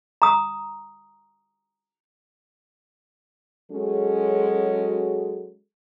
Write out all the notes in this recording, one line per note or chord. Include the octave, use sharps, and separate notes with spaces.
A#5 D#6
F#3 G#3 C#4 F#4 G#4 A4